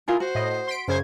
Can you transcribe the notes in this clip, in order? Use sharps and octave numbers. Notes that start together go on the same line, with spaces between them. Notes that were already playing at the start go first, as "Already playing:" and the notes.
E4 F4 G#4 A#4
F#4 C5
A2 D#5
C6 B6 D7
F#2 C#3 C5 G#6